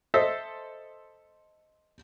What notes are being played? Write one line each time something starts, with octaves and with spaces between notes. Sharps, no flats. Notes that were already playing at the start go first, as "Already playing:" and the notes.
A4 C5 D#5 E5